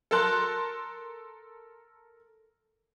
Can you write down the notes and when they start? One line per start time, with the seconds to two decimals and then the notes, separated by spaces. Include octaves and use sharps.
0.11 A4 A#4 A5 C6 F#6